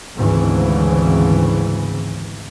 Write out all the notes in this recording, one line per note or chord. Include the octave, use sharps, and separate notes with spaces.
G#1 D2 G#2 C#3 E3